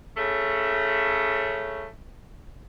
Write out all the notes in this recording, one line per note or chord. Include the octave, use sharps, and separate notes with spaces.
C#3 A3